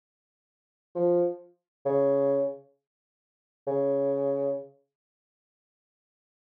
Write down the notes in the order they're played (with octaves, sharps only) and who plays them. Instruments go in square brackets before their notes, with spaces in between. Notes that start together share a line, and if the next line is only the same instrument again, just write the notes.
[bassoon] F3
C#3
C#3